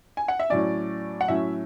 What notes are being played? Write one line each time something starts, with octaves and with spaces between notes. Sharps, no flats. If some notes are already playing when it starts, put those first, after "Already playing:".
G#5
F#5
E5
A2 F#3 C#4 D5
F#5
A2 F#3 C#4 E5